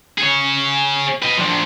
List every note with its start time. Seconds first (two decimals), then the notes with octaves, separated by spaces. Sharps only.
0.18 G#4 C#5
1.22 B4 D#5
1.38 F3 D4